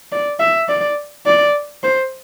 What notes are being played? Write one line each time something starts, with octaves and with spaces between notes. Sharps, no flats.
D5
E5
D5
D5
C5